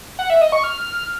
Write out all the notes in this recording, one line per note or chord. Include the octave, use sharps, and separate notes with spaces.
F#5
E5
D#5
C#6
F6